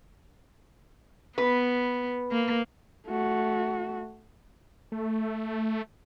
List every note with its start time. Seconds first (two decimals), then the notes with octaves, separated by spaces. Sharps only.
1.38 B3 B4
2.32 A#3
3.07 A3 F#4
4.92 A3